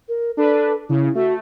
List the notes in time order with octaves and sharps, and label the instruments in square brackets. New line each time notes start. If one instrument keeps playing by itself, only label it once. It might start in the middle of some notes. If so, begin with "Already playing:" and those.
[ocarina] A#4
[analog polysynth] D4 B4 [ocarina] A4
[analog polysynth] C#3 [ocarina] E4
[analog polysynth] A3 [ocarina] F#4